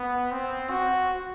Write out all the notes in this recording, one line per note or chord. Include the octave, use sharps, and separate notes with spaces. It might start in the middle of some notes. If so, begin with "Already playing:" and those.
Already playing: B3
C4
F#4